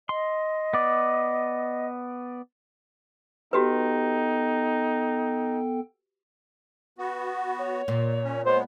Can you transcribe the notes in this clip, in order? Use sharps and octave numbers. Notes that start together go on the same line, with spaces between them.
D#5 C6
B3 D5
B3 D#4 F#4 G4 A4 B4 G5
B3 F#4
C#5
A#2
C#4
G#3 B3 C5 C#5